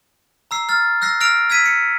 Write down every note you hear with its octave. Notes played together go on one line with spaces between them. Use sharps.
A#5 E6 C7
F6 A6
E6 F#6 A#6 C7
E6 F6 A#6 C7 D7 F7
E6 G#6 B6 D#7
C#7